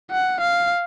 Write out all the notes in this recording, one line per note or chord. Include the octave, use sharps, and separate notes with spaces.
F#5
F5